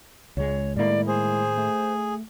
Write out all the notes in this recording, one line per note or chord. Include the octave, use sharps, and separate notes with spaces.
C#2 G#3 C#5
A2 D#3 G#3 A#3 E4 D5
G#4 C5
A3